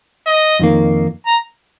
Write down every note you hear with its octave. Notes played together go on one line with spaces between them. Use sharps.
D#5
F2 D#3 A#3
A#5